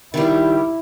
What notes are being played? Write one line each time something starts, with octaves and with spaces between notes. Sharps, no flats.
D#3 G3 E4